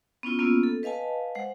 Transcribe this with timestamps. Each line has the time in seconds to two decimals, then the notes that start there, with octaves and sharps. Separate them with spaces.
0.23 B3 C#4 E4 F4
0.39 A#3 B3 C#4 F4 E6
0.63 A4
0.83 B4 D#5 F5 G#5 A5
1.35 G#3 C5 F#5